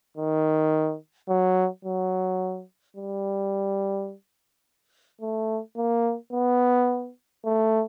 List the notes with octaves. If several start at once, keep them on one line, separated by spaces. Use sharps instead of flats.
D#3
F#3
F#3
G3
A3
A#3
B3
A3